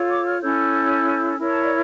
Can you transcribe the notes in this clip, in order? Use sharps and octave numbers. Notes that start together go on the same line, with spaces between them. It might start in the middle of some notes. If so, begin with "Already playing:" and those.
Already playing: F4 A4 C#5
D6
F6
C#4 E4 A4 C#5 G6
E4 A#4 C#5
A5
D5